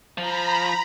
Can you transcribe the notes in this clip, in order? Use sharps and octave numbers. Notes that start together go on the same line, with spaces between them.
F3 A#5 B5